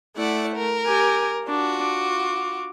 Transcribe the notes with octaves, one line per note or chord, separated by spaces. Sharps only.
A3 E4 D5 F#5
A#4
G4 G#5
D4 F4 F#4
D6